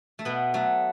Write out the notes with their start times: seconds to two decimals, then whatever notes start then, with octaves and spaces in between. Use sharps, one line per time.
0.19 A3
0.25 B2 B3
0.54 F#3 A3